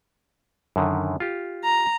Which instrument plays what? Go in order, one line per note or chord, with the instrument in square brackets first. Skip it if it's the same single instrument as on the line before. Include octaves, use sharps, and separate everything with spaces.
[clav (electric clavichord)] F#2 D3 D#3
F4 G4
[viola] A#5